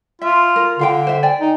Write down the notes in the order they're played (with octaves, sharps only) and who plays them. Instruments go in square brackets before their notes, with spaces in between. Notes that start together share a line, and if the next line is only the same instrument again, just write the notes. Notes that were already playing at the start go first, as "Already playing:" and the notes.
[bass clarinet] F4 [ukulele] E5
[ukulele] A#4
[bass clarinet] D3 [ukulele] F4 F5 G5
[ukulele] C5 E5
D5 G5 G#5
[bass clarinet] D#4